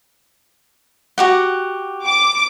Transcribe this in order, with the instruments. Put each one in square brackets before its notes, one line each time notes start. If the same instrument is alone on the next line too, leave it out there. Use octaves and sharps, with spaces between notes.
[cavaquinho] F#4 G4 F#5
[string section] D6